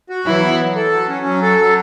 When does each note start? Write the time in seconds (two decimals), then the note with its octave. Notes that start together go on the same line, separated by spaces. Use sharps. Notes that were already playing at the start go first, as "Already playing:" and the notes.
0.09 F#4
0.25 E3 F#3 E4
0.42 B3
0.58 F#3
0.75 A4
0.91 F#3
1.08 C#4
1.26 F#3
1.42 A4
1.58 F#3